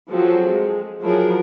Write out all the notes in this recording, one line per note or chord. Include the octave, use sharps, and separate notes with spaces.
F3 F#3 C4 F#4 G#4 A4
G#3
F3 F#3 E4 G#4 A#4